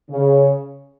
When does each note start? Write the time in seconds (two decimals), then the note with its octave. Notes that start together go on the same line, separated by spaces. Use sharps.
0.11 C#3